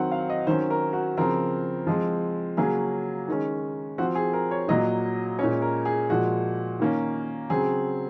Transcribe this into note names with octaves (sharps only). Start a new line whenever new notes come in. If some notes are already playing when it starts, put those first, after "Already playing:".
Already playing: D#3 F#3 C4 F#5
F5
D#5
D#3 F#3 C#4 C5
A#4
F#4
C#3 F3 C4 A#4
F3 G#3 C4
C#3 F#3 A#3 C#4 G#4
D#3 G#3 C#4
F3 C4 F#4
G#4
A#4
C#5
A#2 F#3 A#3 D#5
A#2 G#3 C#4 C#5
A#4
G#4
A#2 F3 G#3 F#4
D#3 A#3 C#4
C#3 F#3 C4 G#4